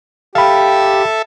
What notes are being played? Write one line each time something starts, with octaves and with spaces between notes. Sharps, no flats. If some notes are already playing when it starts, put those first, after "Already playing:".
G4 A4 E5 F5 B5